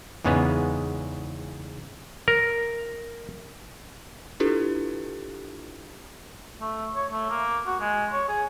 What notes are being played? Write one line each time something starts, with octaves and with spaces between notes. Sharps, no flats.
E2 G#2 C#3 G#3 B3
A#4
D4 E4 F4 G4 A4 B4
A3
C#5
A3
A#3
F#4
G#3
C#5
G#4